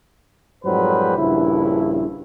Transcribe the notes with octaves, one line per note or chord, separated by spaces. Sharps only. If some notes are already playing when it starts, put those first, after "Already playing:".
F2 G#2 F#3 G3 B4 C5
A#1 G2 C#3 E4